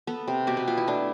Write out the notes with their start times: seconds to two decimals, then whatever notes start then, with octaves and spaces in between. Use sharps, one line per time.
0.07 B3 A4
0.28 C3
0.47 B2 G4
0.57 B4
0.68 B3 F4
0.77 E4
0.87 A3 D4